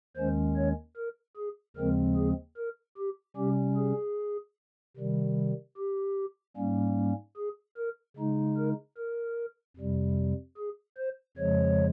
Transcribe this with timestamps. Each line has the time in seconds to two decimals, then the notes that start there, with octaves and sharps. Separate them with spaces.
0.16 D#2 D#3 G#3 C#4 C5
0.56 C#5
0.97 A#4
1.37 G#4
1.76 D#2 C#3 F3 G#3 C4 A#4
2.16 G#4
2.57 A#4
2.97 G4
3.37 C3 G3 C#4 G4
3.77 G#4
4.97 C3 D#3 G3
5.77 G4
6.57 G#2 G3 A#3 C#4
7.37 G#4
7.77 A#4
8.17 C#3 G#3 D#4
8.57 A#4
8.98 A#4
9.77 F2 C3 G3
10.57 G#4
10.97 C5
11.37 F2 C#3 F3 G#3 C#5